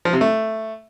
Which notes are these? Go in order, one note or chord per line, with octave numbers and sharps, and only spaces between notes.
F3
C3
A3